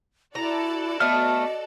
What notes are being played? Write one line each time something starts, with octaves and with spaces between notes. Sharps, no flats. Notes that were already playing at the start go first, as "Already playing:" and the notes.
E4 F#4 A4 D5 A#5
A3 B3 D#5 F6